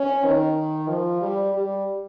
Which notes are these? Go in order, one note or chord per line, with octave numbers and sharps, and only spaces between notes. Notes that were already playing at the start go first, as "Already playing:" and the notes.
Already playing: C#4
D#3
F3
G3
G3